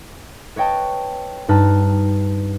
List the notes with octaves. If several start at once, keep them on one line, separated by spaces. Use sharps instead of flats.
B4 C#5 D#5 G5 A5
G2 D#4 B4 A5 F6